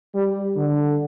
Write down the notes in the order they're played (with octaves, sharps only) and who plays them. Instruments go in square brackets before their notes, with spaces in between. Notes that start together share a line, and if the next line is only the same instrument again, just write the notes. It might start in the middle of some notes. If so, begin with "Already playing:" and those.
[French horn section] G3
D3